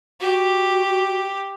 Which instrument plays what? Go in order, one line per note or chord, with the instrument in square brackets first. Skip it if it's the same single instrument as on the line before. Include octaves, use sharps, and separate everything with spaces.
[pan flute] F#4 [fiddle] G4